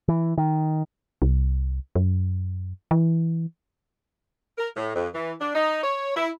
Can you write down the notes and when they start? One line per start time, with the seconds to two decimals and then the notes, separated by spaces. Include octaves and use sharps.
0.08 E3
0.38 D#3
1.22 C2
1.96 F#2
2.91 E3
4.57 A#4
4.76 A2
4.94 F2
5.14 E3
5.40 D4
5.54 D#4
5.83 C#5
6.15 E4